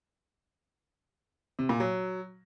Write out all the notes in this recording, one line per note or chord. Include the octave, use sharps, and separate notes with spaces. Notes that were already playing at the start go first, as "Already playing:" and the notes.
C3
A#2
F#3